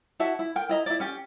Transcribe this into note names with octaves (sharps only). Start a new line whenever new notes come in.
E4 F#4 E5 A5
E4
A#4 G5
E4 D#5 A#5
E4 D5
C#4 G4